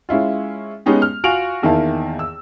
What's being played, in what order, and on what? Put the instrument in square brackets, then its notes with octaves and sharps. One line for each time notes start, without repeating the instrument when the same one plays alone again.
[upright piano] G#3 C#4 E4 F4
G#3 B3 C#4 D#4 G4
F6
F4 F#4 G#5 D7 F7 F#7
E2 D#3 A#3 E4 A5
E6